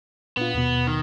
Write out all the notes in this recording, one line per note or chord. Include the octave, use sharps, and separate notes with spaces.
A#2 B3 D4 F4
D#2 B2
D#3